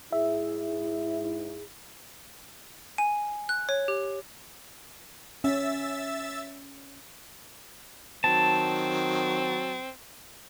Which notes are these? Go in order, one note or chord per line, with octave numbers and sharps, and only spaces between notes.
G#2 E4 G#4 E5
G#5
F#6
C#5
G4
C#4 E5 E6 A6
D#3 F#3 C4 A5